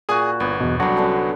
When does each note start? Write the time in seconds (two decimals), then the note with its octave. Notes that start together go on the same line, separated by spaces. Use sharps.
0.09 A#2 F#4 G#4 G#5 D#6
0.40 G1 B3
0.60 E2 B2
0.80 C2 D3 F#3 G3 F#4
0.97 D3 B3 C#4